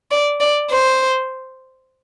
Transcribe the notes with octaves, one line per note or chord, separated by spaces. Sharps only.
D5
D5
C5